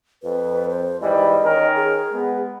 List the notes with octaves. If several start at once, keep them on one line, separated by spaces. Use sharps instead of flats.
F2 B4
C5
G#2 E3 G3 D#5
D#3 C#4 A#4
G#4
G#3 B3